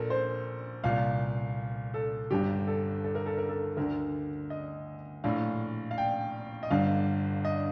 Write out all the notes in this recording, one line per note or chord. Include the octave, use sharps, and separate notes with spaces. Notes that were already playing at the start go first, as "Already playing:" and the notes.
Already playing: A#1 A#2 A4 A#4
C5
C2 A#2 F5
A4
G1 G2 D3 G4
A4
A4
A#4
A4
A#4
A4
D2 D3 A#4
D#5
A#1 A2 F5
F5
G5
D#5
G1 G2 D3 F5
D#5